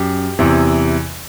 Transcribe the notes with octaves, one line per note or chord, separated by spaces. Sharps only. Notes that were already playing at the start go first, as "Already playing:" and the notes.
Already playing: F#2 G4
E2 C3 E3